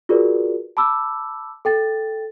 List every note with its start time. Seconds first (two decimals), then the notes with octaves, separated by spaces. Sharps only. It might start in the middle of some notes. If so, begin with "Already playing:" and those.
0.09 F4 F#4 G#4 A#4 B4 D5
0.77 A5 B5 D6 E6
1.65 A4 G5 A6